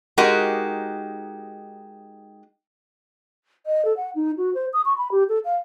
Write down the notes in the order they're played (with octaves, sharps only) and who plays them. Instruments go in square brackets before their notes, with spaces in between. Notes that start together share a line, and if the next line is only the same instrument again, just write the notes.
[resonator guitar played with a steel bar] G#3 D#4 F#4 G4 A#4
[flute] D#5
A4
F#5
D#4
F#4
C5
D#6
C#6
B5
G4
A4
F5